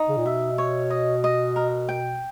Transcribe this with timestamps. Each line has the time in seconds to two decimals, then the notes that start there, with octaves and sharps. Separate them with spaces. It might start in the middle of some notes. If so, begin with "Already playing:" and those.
Already playing: D#4
0.09 C#3
0.17 A#2
0.26 B2 E5
0.58 C#5
0.90 D#5
1.24 D#5
1.56 A#4
1.89 G5